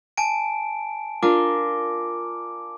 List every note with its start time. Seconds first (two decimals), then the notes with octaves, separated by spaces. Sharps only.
0.17 G#5 A5 D7
1.23 D4 F4 A#4 D6